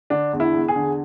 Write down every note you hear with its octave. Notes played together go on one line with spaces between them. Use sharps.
D3 D4
E2
E4
E2
G#4
D3